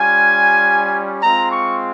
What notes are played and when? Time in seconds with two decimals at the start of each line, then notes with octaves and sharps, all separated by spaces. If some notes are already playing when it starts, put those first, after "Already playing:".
Already playing: G3 C#4 F4 G#5
1.23 G#3 C4 F4 A#5
1.52 C#6